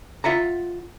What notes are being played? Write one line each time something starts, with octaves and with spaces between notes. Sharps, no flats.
F4 E5 F#5 A#5